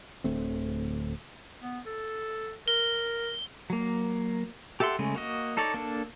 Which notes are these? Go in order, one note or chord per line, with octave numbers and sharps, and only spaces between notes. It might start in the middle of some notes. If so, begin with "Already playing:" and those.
D1 D2 A3 C4
B3
A4
A#4 G7
F#3 A#3
G4 A4 E5 F#5 C6
C#3 G#3 A3
A#3 F#4 D#5
D#4 A4 C#5 D5
A#3 D4 A4